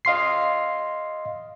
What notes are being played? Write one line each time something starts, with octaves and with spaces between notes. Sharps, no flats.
D#5 F5 C6 C7